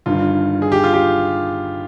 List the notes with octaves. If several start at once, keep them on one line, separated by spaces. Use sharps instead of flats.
G1 G2 D#3 F4
G#4
G4
F4
G4